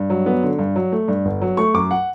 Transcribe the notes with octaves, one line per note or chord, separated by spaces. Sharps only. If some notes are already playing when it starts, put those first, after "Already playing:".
Already playing: G2
F#3
B3
D3
G2
F#3
A3
G2
G1
F#3
A3 C#6
F#2 D6
F#5